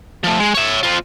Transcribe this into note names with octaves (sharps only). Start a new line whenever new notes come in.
F3 A3
G#3
C#5 E5
C4 F4